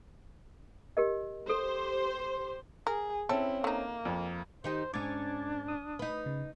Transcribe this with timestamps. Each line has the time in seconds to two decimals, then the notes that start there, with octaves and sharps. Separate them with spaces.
0.97 G4 A#4 D#5
1.49 G4 A4 C5
2.87 G#4 A#4
3.29 C4 C#4 E4 A4
3.64 A3 A#3 D#4
4.05 F2
4.64 D#3 D#4 G4 C5
4.94 G#2 C#4 D4 D6 G#6 A6
5.68 D#6
5.99 D#4 B4
6.26 C#3